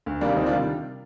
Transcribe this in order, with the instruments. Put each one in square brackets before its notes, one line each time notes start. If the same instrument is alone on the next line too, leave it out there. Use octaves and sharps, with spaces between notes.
[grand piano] D2
C3 D#3 G3 A#3 D4
D2 C4 D#4
D4 F4
C3 D#3 G3